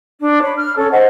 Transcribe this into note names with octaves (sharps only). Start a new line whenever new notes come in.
D4
C#5 B5
F6
C#4 A4 C#5
C5 D#5 F#5